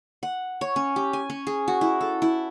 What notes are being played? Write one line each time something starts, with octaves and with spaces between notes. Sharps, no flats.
F#5
C#5
C#4
G4
G#5
C#4
G#4
F#4
E4
A4
E4